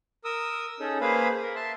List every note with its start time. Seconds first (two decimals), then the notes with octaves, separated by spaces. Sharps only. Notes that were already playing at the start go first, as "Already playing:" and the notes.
0.24 A#4 D#6 E6
0.80 C#4 D#4 G#4 A4
1.01 A#3 G#4 B4 C5 F5 B5
1.42 A#4
1.55 E5 A5 C6